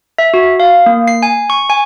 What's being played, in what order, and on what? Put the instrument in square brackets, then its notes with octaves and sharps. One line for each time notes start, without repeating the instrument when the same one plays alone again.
[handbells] E5
F#4
F5
A#3
C7
G#5
C#6
G#5